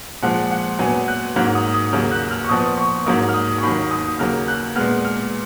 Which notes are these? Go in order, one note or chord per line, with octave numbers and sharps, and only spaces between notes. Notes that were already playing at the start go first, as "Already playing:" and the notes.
A#2 F3 G#3 F#5
F#5
A#2 F#3 B3 G#5
F#6
G#2 F#3 A#3 F6
D#6
D#6
D#2 C#3 F#3 A#3 F6
F#6
F6
C#6
A#2 F3 B3 D#6
C#6
G#2 F#3 A#3 D#6
F6
D#6
C#6
D#2 D#3 F#3 B5
D#6
D#2 C#3 F#3 A#3 F6
F#6
A#2 G#3 B3 F6
F6